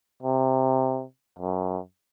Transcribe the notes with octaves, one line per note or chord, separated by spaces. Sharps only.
C3
F#2